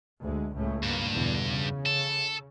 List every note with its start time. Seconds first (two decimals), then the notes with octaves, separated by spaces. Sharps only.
0.21 D2 G#3
0.54 C#2 A2 A3
0.83 G2 B2 A#3
1.13 E2 B2 D3
1.52 C#3
1.86 A4